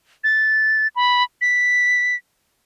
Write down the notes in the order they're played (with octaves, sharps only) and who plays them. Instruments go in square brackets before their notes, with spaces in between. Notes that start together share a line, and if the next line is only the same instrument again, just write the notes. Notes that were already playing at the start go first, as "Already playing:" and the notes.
[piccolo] A6
B5
B6